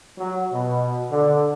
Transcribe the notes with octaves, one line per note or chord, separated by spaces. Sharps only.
F#3
B2
D3